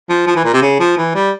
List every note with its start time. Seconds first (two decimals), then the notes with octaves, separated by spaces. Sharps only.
0.09 F3
0.27 F3
0.36 E3
0.45 A#2
0.53 C3
0.62 C#3
0.80 F3
0.97 E3
1.15 G3